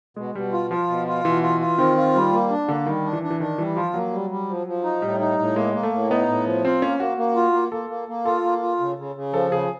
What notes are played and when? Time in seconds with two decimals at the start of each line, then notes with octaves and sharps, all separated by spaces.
0.16 B2 G#3
0.35 B2 G3
0.53 F4
0.70 F3 F4
0.89 B2
1.07 F4
1.25 B2 E3
1.43 F4
1.60 F4
1.78 D#3 C4
1.97 F4
2.15 G3
2.32 A#3
2.50 D4
2.68 D3 A#3
2.86 D#3 G3
3.04 D4
3.13 E3
3.23 D4
3.30 E3
3.40 D#3 D4
3.58 E3 G3
3.77 F3 F4
3.94 F#3 A#3
4.13 G3
4.30 G3
4.48 F3
4.67 F3
4.84 D#4
5.02 A2 G3
5.20 D#4
5.39 A2
5.56 G#3 A#3
5.74 A#3
5.83 A3
5.92 A2
6.10 B3 D#4
6.28 A2
6.46 F3
6.65 C4 F4
6.82 A#3 C#4
7.00 A#3 F#4
7.18 A#3
7.35 F4
7.53 A#3
7.72 A#3 A4
7.90 A#3
8.08 A#3
8.25 F4 A4
8.44 A#3
8.63 F4
8.80 C#3
8.98 C#3
9.16 C#3
9.33 F3 A4
9.52 C#3 G#4